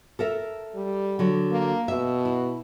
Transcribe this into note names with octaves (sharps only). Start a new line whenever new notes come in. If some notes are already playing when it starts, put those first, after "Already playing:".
A4 A#4 E5
G3
D3 F#3
A#3
B2 E5
E4